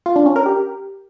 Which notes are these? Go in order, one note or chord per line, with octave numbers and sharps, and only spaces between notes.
F4
D4
C#4
A#4
G4